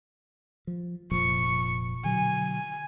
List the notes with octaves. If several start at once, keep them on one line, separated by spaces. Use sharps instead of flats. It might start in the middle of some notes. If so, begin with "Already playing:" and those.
F3
F1 A#2 F3 C#6
B2 D3 F#3 G#5